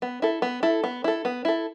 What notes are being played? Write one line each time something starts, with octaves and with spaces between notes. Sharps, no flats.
B3
E4 A4
B3
E4 A4
B3
E4 A4
B3
E4 A4